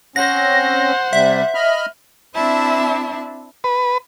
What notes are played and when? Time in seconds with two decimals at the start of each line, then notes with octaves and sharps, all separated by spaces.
0.16 C4 C#4 C5 F#5 A#6
1.13 C3 G3 E5
1.55 D#5 B5 F6
2.34 C4 D4 E4 E5 A5
3.64 B4